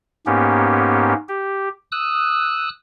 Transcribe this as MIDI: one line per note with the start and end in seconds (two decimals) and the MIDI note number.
0.26 1.14 44
0.26 1.14 58
0.26 1.14 59
0.26 1.14 61
0.26 1.14 67
1.28 1.69 67
1.92 2.69 87
1.92 2.69 88
1.92 2.69 90